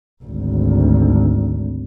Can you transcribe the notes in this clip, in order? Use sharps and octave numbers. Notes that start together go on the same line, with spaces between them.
G#1 D2